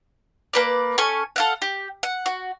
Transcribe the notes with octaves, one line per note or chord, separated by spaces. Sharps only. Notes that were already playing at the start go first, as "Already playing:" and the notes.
A#3 B4 D5
C#4 A4 G#5 C#6
A4 F5 F#5
G4
F#5
F#4